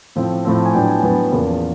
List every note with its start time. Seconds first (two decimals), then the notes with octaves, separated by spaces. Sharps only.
0.15 A2 F3 A3 C4
0.45 A2 F3 A3 C4
0.65 G#5
0.73 A2 F#3 B3 D4 G5
0.89 G#5
1.03 A2 F#3 B3 D4 A5
1.32 E2 C#3 F3 A#3